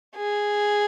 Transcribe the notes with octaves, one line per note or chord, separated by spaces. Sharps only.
G#4